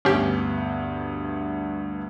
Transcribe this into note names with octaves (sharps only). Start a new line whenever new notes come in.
D2 G2 B3 C#4 G4